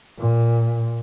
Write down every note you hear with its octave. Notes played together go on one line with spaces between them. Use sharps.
A#2